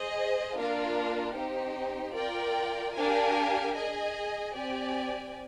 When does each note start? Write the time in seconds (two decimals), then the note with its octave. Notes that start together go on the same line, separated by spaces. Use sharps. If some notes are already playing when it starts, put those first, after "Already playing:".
Already playing: G#4 C5 D#5
0.56 A#3 D4 F4 A#4 F5
1.35 C4 D#4 G4 C5
2.15 F4 A#4 D5 G5
2.94 D4 G4 A#4 F5 G#5
3.75 G#4 D#5 G#5
4.54 C4 G4 D5 G#5